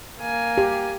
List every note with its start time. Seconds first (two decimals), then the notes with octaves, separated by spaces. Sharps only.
0.21 A#3 G#5
0.58 G4